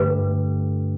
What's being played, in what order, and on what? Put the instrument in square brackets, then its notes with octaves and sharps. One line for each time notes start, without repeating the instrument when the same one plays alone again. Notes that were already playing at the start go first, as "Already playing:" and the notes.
Already playing: [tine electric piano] G2 D3 A3 G4 [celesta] B4